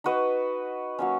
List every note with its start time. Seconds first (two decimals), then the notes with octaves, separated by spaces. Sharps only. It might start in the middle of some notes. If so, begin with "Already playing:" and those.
0.04 D#4 F#4 B4 D#5
0.99 F#3 A#3 C#4